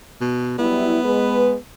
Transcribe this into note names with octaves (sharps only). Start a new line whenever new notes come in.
B2
F#3 G3 B3 E4
G#3 B4